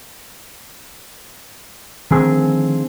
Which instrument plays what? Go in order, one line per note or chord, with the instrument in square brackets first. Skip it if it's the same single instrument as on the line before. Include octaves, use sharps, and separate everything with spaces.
[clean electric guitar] D3 C4 G#4 [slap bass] D#3 F3 A3